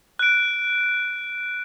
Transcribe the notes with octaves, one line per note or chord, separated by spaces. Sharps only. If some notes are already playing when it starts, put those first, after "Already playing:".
F#6 D7